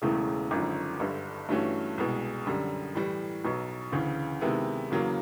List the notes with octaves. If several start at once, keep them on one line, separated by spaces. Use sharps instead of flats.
E1 E2 C#3 E3 A3
G#1 F#2 D3 F3
G1 G2 D3
G2 E3 A3 C#4 F#4
C2 B2 G#3
F#2 D3 G3
A2 E3 G3
B1 B2 F#3
D2 C#3 E3
C3 D#3 G#3 B3 E4
E2 C#3 F#3 A#3